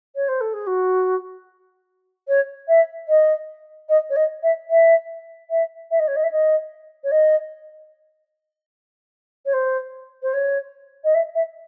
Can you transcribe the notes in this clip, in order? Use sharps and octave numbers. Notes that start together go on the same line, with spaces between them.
C#5
C5
A4
G#4
F#4
C#5
E5
D#5
D#5
C#5
D#5
E5
E5
E5
E5
D#5
C#5
D#5
E5
D#5
C#5
D#5
C#5
C5
C5
C#5
D#5
E5
E5